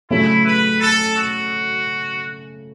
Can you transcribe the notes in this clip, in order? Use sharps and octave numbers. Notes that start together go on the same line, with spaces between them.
C#3 F#3 A3 C#4 E4
B4
A4
F#4